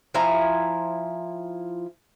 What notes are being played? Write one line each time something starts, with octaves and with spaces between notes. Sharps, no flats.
F3 E4 G#5 A#5